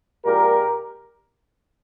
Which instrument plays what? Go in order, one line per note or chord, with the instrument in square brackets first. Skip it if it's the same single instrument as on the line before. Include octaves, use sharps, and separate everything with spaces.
[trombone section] A#1 A#2 G#3 G4 A#4